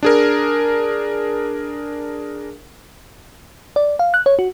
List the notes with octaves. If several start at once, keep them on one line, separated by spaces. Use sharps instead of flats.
D4 G#4 A#4
D5
F5
F#6
C#5
F#4